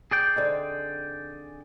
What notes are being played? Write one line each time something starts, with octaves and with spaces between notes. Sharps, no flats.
G#4 D5 G5
D3 C4 D#4